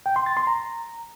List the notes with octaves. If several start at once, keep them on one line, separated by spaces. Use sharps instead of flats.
G5
C6
A6
C6
A#5